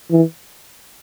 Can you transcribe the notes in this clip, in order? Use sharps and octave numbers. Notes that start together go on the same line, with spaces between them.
E3